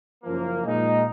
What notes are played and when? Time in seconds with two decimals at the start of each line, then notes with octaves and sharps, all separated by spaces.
0.24 F#1 F#2 F3 A#3
0.64 A#2 G#3 D#4